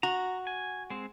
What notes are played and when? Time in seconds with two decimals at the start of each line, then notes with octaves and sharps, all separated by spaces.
0.03 F#4 A#5
0.47 G#5
0.90 G#3 C4